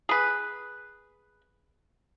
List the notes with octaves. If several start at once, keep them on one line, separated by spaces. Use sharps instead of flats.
G#4 B4